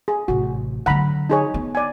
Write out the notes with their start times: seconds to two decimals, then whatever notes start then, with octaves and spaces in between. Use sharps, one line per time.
0.08 G#4
0.28 A1 C3 F#4
0.86 D3 F#3 F#5 A#5 B5
1.30 D#4 G#4 C#5
1.54 B3
1.75 D5 G#5